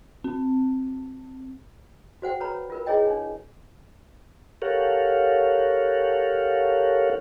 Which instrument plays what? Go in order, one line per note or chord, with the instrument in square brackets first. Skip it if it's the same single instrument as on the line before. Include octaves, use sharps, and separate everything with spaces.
[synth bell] C4
[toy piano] F#4 C5 F#5 G5
B4 C#5 A#5 B5
F4 A#4 B4
E4 G#4 C#5 D#5 G5
D4 C#5
[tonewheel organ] G4 A4 A#4 C#5 F5 F#5